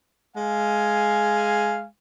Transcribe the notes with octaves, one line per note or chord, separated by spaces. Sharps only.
G#3 F5 G#5